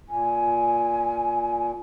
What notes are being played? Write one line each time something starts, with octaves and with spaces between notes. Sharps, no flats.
A#2 G#5